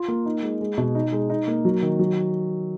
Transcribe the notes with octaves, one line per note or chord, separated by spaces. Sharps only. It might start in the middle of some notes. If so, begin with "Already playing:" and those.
Already playing: F4
A#3
D#4
G#3
G#3
B2
D#4
G#3
D#4
A#3
F#3
D#3
F#3